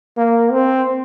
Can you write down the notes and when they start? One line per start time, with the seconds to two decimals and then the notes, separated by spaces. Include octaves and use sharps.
0.17 A#3
0.52 C4